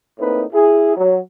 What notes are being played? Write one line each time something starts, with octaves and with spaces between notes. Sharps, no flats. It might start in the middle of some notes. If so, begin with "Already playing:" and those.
A2 A#3 C4 D#4 B4
E4 G#4
F#3